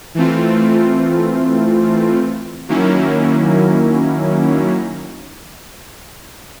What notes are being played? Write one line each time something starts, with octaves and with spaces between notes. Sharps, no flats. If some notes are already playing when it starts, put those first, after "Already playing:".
E3 A3 C4 F4
D#3 F#3 A#3 C#4 E4